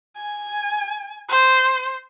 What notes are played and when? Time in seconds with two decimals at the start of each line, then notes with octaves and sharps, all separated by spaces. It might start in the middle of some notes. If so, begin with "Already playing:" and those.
0.16 G#5
1.29 C5